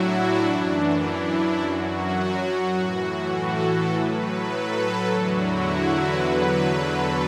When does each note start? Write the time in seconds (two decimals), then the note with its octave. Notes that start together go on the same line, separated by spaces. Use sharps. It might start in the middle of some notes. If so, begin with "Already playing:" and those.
Already playing: A2 F#3 D4 E4 F#4
0.45 F#2 E3
1.02 E4
1.31 D4
1.60 F#2 F#3 F#4
2.76 A2 E3
3.34 A4
3.62 A4
3.91 A2 F#3 B4
4.20 B4
4.48 A4
5.06 E2 D3 F#3 F#4
5.35 E4
5.64 F#4
5.92 B4
6.21 E2 D3 F#3
6.79 A4